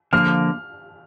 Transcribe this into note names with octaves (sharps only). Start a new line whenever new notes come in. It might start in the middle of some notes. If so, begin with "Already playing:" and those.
D3 F3 A#3 F6